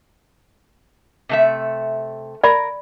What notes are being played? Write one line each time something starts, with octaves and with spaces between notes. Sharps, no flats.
C3 A3 E5
A#4 D5 B5